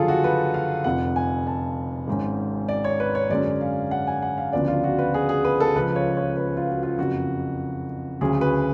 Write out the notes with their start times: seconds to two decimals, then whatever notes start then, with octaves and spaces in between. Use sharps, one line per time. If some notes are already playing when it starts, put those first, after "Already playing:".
Already playing: F#1 F#2 D3 F3 F4 G#4 A4
0.08 F#4
0.24 B4
0.54 F5
0.84 F1 F2 F3 F#5
1.16 G#5
1.47 A5
2.07 G#1 G#2 G#3 C#4
2.68 D5
2.84 C#5
3.00 B4
3.15 C#5
3.30 F#2 D3 G#3 C#4 D5
3.61 F5
3.91 F#5
4.07 G#5
4.22 F#5
4.38 F5
4.52 D2 C#3 F3 B3 D4 D5
4.68 F4
4.84 F#4
4.99 B4
5.14 G#4
5.29 G#4
5.45 B4
5.60 A4
5.76 C#2 C#3 F3 B4
5.96 C#5
6.17 C#5
6.37 B4
6.57 F4
6.67 F#4
6.83 F4
6.98 F#1 F2 C#3 F#4
8.21 D2 C#3 F#3 G#4
8.41 B4